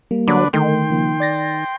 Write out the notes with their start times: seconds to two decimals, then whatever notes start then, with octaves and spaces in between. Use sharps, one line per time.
0.11 G3 A#3
0.28 D3 F#3 D4 B4
0.53 D3 D#3 A3 D#4 G5 C6
0.90 C#3 F3 A#3
1.20 D5 A6 A#6